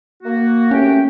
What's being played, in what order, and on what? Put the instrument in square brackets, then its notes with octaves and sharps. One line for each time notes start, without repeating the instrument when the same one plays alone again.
[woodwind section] A#3 F#4
[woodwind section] A3 G4 G5 [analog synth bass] C#4